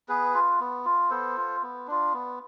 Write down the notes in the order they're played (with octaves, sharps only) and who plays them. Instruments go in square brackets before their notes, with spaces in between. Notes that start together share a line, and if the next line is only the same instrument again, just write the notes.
[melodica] B3 G#4 B4
F4
B3
F4
B3 A4 C5
F4
B3
D4 F4
B3